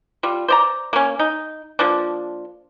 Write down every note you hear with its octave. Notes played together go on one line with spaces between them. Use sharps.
G3 F4
C5 D5 A#5
A#3 C#4
D#4
F3 A#3 D4